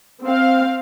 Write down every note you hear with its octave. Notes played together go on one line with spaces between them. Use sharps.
C4 F5